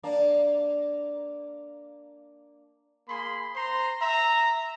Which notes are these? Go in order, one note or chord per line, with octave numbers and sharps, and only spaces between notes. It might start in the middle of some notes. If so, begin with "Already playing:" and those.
A#3 D4
A#3 G#4 B5 C6
C5 A#5 C6
E5 A#5